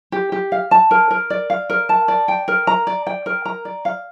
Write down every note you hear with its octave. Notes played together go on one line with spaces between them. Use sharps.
G4
G4
F5
A5
A#4
A#4
D5
F5
A#4
A5
D5
G5
A#4
A#5
D5
G5
A#4
A#5
D5
F5